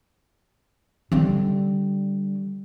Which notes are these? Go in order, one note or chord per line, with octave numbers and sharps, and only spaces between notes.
D3 G3